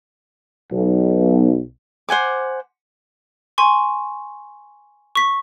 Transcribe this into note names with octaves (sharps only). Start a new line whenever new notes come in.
B1
C5 F#5 G#5 D6
G#5 C6 C#6
C#6 B6